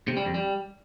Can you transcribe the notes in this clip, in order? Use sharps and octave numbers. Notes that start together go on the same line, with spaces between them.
C3
G3
F2
G3